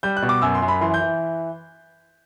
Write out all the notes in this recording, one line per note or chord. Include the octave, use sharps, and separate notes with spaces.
G3 G6
F#6
B2
D6
F#2 E6
C6
F#2
B5
E3 C6
G6
E3